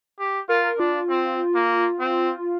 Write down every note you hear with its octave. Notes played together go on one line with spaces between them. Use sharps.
G4
F4 A#4
D4 F4
C4
A#3
C4